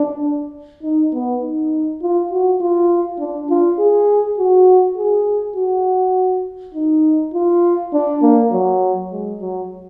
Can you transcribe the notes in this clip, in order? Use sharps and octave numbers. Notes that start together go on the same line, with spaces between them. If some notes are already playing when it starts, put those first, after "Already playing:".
Already playing: D4
D#4
B3
D#4
F4
F#4
F4
D4
F4
G#4
F#4
G#4
F#4
D#4
F4
D4
A#3
F#3
G#3
F#3